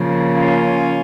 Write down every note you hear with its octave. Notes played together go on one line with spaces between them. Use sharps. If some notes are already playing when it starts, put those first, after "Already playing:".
Already playing: C#3 F3 A#3
C#4 F4